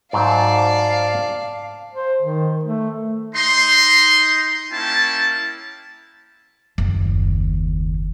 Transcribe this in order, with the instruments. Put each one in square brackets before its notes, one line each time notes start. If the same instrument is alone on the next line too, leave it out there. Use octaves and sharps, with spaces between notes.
[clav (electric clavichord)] G#2 F#3 C5 [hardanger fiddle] D5 A5 [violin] F5
[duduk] C5
D#3
A3
[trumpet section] D#4 C6
A#3 C#4 E4 G5 A5
[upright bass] F#1 D#2